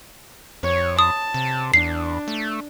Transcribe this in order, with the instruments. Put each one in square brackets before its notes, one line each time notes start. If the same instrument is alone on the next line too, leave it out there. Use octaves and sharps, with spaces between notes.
[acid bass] F2 [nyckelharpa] C#5
[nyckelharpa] A5 [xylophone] D#6
[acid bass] C3
[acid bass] E2 [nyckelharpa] D4 [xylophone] C7
[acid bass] A3